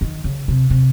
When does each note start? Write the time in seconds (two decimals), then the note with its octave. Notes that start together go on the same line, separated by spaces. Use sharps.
0.01 D#3
0.24 C#3
0.48 C3
0.70 C3